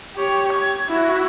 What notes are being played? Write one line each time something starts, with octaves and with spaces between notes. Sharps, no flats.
G4 C#5
G#6
E4 F#4